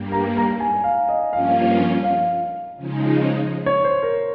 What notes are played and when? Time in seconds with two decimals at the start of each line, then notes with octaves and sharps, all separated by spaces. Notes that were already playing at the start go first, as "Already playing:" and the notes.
Already playing: G2 G3 A#3
0.12 A#5
0.37 A#5
0.60 G#5
0.84 F5
1.09 D#5
1.32 G2 F3 A#3 C#4 F4 F5
2.04 F5
2.76 C#3 F3 G#3 D#4
3.66 C#5
3.84 C5
4.03 A#4